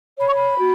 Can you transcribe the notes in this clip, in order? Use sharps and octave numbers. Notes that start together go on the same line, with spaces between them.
C#5 B5
C#6
B5
F#4